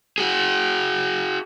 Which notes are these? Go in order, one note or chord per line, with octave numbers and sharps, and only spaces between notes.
F#4 G#4